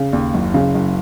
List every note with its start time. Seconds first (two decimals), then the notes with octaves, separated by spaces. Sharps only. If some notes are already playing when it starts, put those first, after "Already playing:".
Already playing: C#3
0.13 D#2
0.34 F#1
0.54 C#3
0.74 F#1